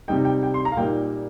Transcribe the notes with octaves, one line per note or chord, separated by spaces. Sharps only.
C3 G3 D#4 G5
G5
G5
C6
A#5
F5
A#2 G3 A#3 D#4 G5